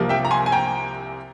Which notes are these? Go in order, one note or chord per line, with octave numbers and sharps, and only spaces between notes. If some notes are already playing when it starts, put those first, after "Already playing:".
Already playing: C2 C3 F3 A#3
E5 G5
A#5
G#5 C6
G#5
G5 A#5